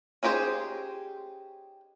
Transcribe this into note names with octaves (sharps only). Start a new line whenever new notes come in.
C#4 D#4 G4 G#4 C5